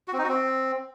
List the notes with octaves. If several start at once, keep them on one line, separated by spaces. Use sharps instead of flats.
F#4
C4
D#4
F#4
C4